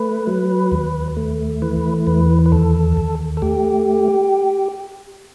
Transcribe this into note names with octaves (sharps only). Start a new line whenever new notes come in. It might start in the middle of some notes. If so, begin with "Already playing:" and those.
Already playing: A3 B4
F#3
D#2
A3
E3 B4
E2 B4
B4
D#2 A4
D#2
A4
A3 G4